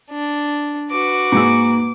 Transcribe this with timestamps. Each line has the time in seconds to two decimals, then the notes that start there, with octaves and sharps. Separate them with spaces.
0.11 D4
0.91 F#4 B4 D6
1.32 G#2 A#3 G#4 E6